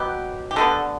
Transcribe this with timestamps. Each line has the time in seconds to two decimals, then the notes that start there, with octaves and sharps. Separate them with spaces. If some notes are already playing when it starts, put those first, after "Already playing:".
Already playing: B2 F#3 B3 G4
0.51 G4
0.56 D3 G3 B3 A4